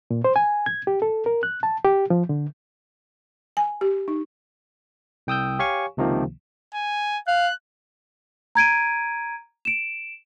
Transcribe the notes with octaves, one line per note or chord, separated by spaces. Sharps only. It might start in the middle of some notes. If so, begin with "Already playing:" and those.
A#2
C5
G#5
G#6
G4
A4
A#4
F#6
A5
G4
F3
D3
G#5
G4
D#4
C2 G5 D#6 E6 G6
G4 C#5 F5 G#5 C#6
C#2 C3 D#3 F3 A#3
G#5
F5 F#6
A#5 G#6 D7 D#7
D7 E7